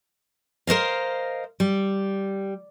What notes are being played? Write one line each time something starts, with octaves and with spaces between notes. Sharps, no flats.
A#4 C5 D#5 F5
G3